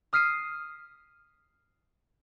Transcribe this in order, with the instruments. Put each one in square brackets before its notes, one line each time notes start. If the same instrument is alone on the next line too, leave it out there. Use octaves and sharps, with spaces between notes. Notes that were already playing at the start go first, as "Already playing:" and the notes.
[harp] D#6 F6 B6 C7 D#7